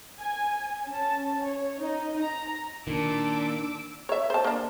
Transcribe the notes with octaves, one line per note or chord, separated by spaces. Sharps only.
G#5
C#4 A5
C#5
D#4
A#5
A#2 D#3 D4 D6 E6
C#5 E5
C5 A5
A#3 D4